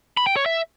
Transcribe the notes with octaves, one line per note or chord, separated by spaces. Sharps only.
B5
G5
C#5
E5